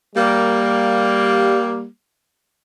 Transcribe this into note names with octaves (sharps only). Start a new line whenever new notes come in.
G3 A#3